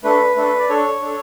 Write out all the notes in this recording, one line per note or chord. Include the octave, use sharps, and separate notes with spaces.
A3 D4 A4 B4
A3 D4 A4 B4
D5
D4 A4 C#5
D4 A4